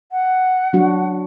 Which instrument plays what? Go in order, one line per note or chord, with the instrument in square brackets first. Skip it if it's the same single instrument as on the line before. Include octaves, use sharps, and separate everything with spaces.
[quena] F#5
[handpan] F#3 D4 F#4